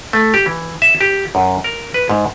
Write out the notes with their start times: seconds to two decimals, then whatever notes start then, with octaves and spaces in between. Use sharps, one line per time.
0.13 A3
0.34 G4
0.46 E3
0.82 E5
1.01 G4
1.35 F#2
1.64 A#4
1.94 B4
2.09 G#2